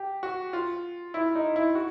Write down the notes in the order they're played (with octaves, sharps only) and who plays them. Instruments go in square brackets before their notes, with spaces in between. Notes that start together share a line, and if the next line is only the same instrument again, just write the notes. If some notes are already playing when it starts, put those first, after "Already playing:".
Already playing: [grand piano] G4
F#4
F4
E4
D#4
E4
F#4